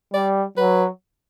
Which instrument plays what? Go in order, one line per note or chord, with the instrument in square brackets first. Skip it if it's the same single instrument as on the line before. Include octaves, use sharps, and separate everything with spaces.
[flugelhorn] G3 [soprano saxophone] D5
[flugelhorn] F#3 [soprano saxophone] B4